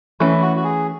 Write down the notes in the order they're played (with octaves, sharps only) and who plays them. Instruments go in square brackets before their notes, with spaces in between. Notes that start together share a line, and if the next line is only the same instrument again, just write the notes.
[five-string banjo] E3 A3 C#4 [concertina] E4
[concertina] F#4
F#4
G#4